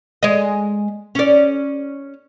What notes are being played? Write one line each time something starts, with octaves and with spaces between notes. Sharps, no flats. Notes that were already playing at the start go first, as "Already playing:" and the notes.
G#3 D#5
C#4 D5